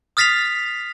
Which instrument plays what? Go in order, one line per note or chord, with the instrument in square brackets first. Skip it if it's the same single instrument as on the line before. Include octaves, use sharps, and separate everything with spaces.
[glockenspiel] D#6 F6 A6 B6 C7 F7